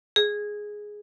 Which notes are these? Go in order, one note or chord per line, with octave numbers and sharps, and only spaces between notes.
G#4